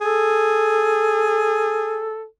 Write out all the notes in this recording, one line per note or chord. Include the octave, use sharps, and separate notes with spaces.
G#4 A4